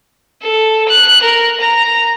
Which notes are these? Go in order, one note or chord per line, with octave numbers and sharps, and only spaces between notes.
A4
F#6
A#4
A#5